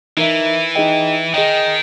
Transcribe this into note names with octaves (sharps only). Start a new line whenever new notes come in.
E3 D#4 A#4 E5
D#4 G#4 D#5 G5
D#3 G#4 D#5 G5